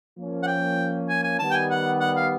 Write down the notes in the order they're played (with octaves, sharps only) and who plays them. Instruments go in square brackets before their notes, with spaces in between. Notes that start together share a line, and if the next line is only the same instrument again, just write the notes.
[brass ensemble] F3 A#3 C#4
[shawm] F#5
G5
G#5
G#5
[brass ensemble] D#3 G3 B3 [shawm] A5
[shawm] G5
G#5
F#5
F#5
F5